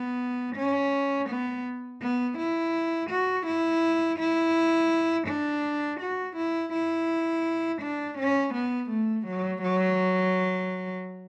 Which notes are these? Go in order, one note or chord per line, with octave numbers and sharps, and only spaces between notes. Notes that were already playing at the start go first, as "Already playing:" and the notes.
Already playing: B3
C#4
B3
B3
E4
F#4
E4
E4
D4
F#4
E4
E4
D4
C#4
B3
A3
F#3
F#3